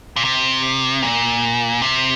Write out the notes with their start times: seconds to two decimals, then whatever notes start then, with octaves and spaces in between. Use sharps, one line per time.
0.16 A#2
0.25 C3
1.02 A#2
1.82 C3